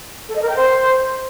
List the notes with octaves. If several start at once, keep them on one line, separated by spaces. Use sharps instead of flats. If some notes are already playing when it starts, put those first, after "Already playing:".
A4
D#5
A#4
G5
C5